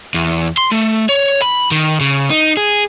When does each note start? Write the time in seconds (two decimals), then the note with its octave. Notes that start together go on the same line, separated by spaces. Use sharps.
0.14 E2
0.57 C6
0.72 A3
1.09 C#5
1.42 B5
1.71 D#3
2.00 C#3
2.30 D#4
2.57 G#4